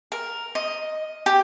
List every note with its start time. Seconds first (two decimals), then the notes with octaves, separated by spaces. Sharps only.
0.12 A#4
0.55 D#5
1.26 G4